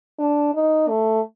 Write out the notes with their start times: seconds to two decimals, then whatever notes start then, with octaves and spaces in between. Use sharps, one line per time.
0.19 D4
0.55 D#4
0.89 A3